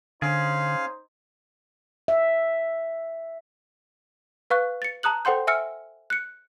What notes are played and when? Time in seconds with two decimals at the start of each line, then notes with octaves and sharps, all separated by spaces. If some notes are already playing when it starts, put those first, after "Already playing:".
0.22 D3 C#4 D#4 G#4 C5 F5
2.08 E5
4.50 B4 F5 C#6 F#6
4.82 A6 C#7
5.03 A5 A#5 D#6 F#6 F#7
5.25 A4 C5 F#5 G5 C6 G6
5.47 E5 G#5 E6 F6 C#7
6.10 F#6 C#7